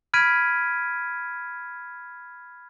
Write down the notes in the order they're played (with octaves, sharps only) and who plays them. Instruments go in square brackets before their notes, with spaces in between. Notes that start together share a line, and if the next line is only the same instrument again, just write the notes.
[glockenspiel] B5 F6 G#6 B6 D7 D#7